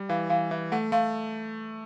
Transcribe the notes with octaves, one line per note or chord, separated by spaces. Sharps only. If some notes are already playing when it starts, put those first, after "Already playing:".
Already playing: G3
E3 F5
E3 F5
E3 E5
A3 F#5
A3 F5